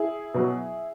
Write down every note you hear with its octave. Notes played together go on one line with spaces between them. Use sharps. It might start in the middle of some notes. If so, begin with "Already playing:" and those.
Already playing: E4 G#4
B2 F#3